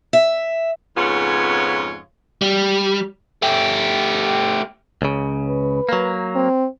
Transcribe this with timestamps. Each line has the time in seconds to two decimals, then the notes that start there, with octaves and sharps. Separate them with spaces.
0.13 E5
0.97 F2 G#2 C#3 B3 F4 C#5
2.42 G3
3.42 A3 G4
5.02 C#2 C#3
5.46 B4
5.89 F#3 A#3
6.35 C4